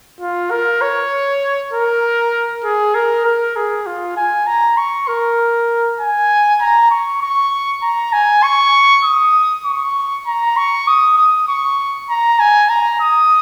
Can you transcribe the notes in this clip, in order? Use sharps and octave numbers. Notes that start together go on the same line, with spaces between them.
F4
A#4
C#5
A#4
G#4
A#4
A#4
G#4
F4
G#5
A#5
C#6
A#4
G#5
A#5
C#6
C#6
A#5
G#5
C#6
D#6
C#6
A#5
C#6
D#6
D#6
C#6
A#5
G#5
A#5
D#6